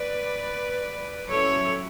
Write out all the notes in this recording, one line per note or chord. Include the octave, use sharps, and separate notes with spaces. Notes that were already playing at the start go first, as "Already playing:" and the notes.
Already playing: B4 D5
F#3 C#4 E4 A4 C#5